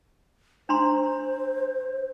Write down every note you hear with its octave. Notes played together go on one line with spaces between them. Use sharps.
D4 C5 A#5 C6